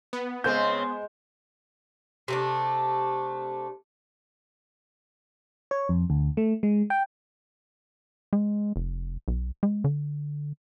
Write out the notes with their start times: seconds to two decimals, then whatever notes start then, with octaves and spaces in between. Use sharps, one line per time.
0.13 B3
0.44 C#3 G#3 C4 C5 G#5 C#6 G6
2.28 C3 A3 D4
5.71 C#5
5.89 F2
6.10 D2
6.37 A3
6.63 G#3
6.90 G5
8.33 G#3
8.76 F1
9.28 B1
9.63 G#3
9.84 D3